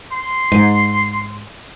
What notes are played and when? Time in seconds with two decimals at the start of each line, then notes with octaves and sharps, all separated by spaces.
0.12 C6
0.52 G#2